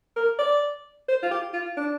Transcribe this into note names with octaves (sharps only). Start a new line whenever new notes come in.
A#4
D5
C5
F4
G4
F4
D4